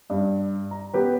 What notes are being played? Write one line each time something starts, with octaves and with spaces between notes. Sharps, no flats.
G2
A#5
B3 G4 B4